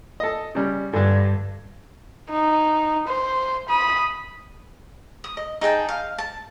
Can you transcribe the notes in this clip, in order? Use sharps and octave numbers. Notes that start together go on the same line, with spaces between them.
A4 D#5
C#3 G3
G2 D3 D4
D#4
C5
B5 D#6
D#6
D#5
D#4 G#4 G5 A5
F5
A5